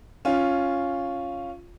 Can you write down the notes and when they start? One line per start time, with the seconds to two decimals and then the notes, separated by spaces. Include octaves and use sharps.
0.25 C#4 F4